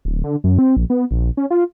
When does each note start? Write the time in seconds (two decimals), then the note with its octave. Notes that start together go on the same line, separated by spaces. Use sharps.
0.05 D1
0.24 D3
0.44 F#2
0.59 C4
0.77 A#1
0.90 B3
1.11 A#1
1.37 C#4
1.51 F4